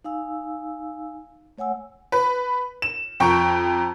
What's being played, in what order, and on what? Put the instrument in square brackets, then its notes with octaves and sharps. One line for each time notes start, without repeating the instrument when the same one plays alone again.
[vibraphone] D#4 F5 G#5 E6
A3 C#5 F#5 G#5 E6
[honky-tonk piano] B4
E7
F2 G5 A#5 C#6